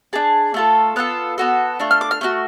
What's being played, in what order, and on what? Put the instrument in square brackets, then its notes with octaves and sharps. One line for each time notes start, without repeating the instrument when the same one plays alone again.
[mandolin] D4 G#4 A5
A3 F4 A4
B3 F4 A4 F#6
B3 F#4 A4
A3 D4 F4
F6
D6
F6
A3 D4 F#4